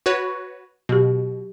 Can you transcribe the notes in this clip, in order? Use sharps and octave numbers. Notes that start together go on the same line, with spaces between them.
F#4 B4 C#5
B2 F#3 G4